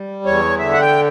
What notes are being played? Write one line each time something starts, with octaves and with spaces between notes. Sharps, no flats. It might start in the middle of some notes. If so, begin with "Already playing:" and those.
Already playing: G3
E2 C#5
D3 E5
F#5
G5